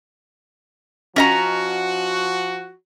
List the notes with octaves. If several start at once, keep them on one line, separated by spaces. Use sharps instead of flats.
F3 C#4 F#4 D#5 A#5